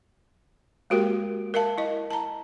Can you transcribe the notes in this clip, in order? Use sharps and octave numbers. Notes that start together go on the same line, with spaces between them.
G#3 A#3 F#4 G4 A#4 G5
A#4 E5 F5 A5
E4 D#5
A5 A#5